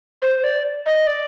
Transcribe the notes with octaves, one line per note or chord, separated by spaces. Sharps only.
C5
D5
D#5
D5